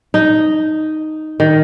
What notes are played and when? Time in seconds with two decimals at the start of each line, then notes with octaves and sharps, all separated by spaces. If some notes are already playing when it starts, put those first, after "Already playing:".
0.14 D#4
1.40 D#3